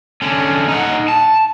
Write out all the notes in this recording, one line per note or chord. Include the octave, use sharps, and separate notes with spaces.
D3 C#4
D#4 F#5
A5